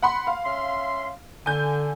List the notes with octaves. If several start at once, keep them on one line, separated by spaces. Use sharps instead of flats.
F#5 B5 C6
F5
C#4 E5 C6
D3 G#5 G6